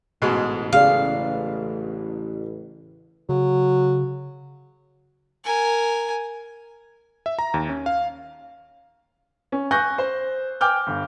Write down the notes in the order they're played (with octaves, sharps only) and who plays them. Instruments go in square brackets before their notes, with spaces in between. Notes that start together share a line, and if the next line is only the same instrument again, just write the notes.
[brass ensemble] A1 [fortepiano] G#2 B2 G#3
[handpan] C#3 G#4 D5 [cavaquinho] F5
[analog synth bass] C#3 [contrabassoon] F#3
[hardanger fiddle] A#4 G#5
[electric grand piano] E5
A#5
D#2
C#4
F5
[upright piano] C#4
G#5 C#6 F#6 G6 A#6
C5
G5 G#5 D6 F6 G6
G1